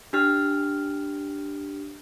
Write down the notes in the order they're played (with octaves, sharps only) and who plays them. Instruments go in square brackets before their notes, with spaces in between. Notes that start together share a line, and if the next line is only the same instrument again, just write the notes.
[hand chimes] D4 G4 F6